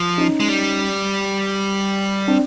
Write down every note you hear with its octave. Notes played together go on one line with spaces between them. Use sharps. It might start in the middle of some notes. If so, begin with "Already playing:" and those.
Already playing: F3
C#4 D#4
G#3
G3
C4 D4